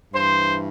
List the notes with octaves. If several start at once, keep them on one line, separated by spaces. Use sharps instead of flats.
G2 E3 C5